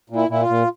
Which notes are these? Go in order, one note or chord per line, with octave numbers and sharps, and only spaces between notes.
A#2
E4
A#2 E4
F4
A#2